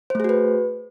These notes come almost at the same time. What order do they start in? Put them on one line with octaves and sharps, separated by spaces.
C5 A3 G#4 F#4 B4